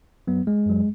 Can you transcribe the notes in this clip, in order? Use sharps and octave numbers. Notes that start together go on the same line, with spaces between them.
F#2 F#3 B3
G#3
F#2 F#3